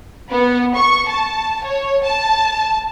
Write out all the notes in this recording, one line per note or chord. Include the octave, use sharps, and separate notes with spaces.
B3
C#6
A5
C#5
A5